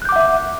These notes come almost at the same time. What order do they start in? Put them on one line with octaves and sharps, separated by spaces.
F#6 G6 D6 F#5 E5